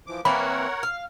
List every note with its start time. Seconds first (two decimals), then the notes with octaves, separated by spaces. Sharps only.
0.07 E3 F3 D6
0.25 E3 A#3 C4 A#4 C#5 F#5 B5
0.83 F5